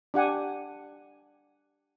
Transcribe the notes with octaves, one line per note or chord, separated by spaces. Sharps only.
D4 G4 F#5 G#5